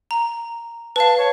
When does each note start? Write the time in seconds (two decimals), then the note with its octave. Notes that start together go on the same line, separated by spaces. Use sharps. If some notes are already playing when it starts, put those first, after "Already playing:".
0.11 A#5
0.96 B4 F5 A5
1.18 C#5